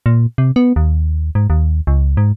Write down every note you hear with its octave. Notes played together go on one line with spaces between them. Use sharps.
A#2
C3
B3
D#2
G#2
D#2
C#2
G#2